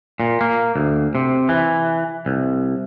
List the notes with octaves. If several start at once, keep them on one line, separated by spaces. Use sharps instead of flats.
A#2
A#3
D2
C3
E3
C2